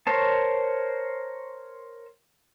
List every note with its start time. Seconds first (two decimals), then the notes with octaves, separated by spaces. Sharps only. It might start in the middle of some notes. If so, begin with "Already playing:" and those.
0.07 A#4 C5 C#5 A5